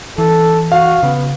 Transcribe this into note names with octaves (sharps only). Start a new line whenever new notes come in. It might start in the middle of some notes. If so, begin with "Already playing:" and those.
E3 A4
F#4 F5
C#3 B3